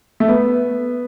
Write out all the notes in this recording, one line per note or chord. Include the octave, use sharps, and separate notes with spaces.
A3
B3